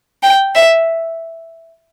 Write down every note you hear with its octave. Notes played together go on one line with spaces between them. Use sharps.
G5
E5